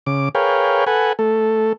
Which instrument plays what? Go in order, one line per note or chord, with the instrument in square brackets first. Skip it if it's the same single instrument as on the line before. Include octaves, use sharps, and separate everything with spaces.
[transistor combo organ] C#3 D6
G#4 A#4 B4 C#5 F5 G5
A4 B4 F#5 G#5
A3 A4